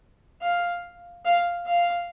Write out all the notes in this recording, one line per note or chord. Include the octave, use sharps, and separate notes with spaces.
F5
F5
F5